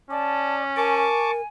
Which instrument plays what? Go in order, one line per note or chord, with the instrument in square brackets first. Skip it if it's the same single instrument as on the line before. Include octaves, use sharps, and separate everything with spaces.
[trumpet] C#4 [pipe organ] D5 [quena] A5
[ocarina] A#4 [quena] G#5 [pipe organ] A5 C#6 D6